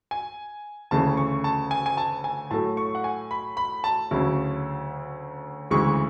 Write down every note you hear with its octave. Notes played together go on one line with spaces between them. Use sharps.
G#5
D2 C#3 E3 A3 C#4 A5
C#6
A5
G#5
G#5
A5
G#5
A2 F#3 A3 A5
C#6
F#5
G#5
B5
B5
A5
D2 C#3 F#3 C#4 E4
D2 C#3 E3 G#3 C#6